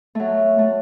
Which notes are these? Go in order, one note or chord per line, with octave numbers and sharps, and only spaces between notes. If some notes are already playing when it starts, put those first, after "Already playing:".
F#3 A3
A3